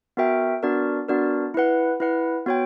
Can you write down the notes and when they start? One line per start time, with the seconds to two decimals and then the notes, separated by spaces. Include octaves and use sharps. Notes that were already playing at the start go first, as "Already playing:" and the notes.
0.17 B3 F#4 A#4 E5 G5
0.63 B3 D4 F#4 A#4 D5
1.08 B3 D4 F#4 A#4 D5
1.54 E4 B4 F#5
2.00 E4 B4 F#5
2.46 B3 F#4 C#5 G5